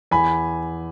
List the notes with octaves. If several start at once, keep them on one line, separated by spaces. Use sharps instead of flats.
E2 G#5 B5